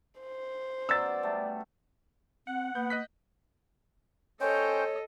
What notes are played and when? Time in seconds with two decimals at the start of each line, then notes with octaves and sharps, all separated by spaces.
0.21 C5
0.89 F#3 B3 C#4 D5 E6 A6
1.23 G3 A3
2.47 C4 F#5
2.75 A#3 B3 G6
2.90 D#5 F#6 B6
4.41 C#4 A4 C5 C#5 D#5 G5